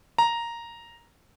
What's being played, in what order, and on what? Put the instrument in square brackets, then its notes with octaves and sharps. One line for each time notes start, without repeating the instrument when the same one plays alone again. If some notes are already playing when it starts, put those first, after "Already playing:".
[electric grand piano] A#5